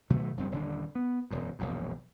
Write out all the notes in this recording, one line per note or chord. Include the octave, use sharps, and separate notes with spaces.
B2 D#3 F#3 A3
F#1 G2 F3 C4
D#1 D3 D4
B3
E1 F#2
E1 A#1 F#2